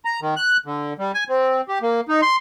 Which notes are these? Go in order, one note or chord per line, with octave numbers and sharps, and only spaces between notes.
A#5
D#3
F#6
D3
G3
G#5
C4
G4
A#3
D#4
C6